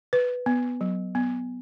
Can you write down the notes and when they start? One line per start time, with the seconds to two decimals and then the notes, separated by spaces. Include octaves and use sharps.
0.13 B4
0.46 B3
0.81 F#3
1.15 B3